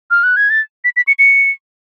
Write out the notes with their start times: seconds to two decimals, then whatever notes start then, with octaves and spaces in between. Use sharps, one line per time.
0.11 F6
0.23 F#6
0.36 G#6
0.50 A6
0.84 B6
0.96 B6
1.07 C#7
1.19 C#7